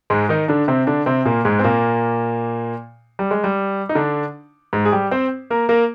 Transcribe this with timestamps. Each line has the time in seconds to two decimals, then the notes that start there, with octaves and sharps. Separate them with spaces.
0.10 G#2 G#3
0.29 D#3 D#4
0.48 D3 D4
0.68 C3 C4
0.87 D3 D4
1.06 C3 C4
1.25 A#2 A#3
1.45 G#2 G#3
1.59 C4
1.64 A#2 A#3
3.19 G3
3.31 G#3
3.44 G3
3.89 D#4
3.95 D3 D4
4.73 G#2 G#3
4.85 G#4
4.92 G3 G4
5.11 C4 C5
5.50 A#3 A#4
5.69 A#3 A#4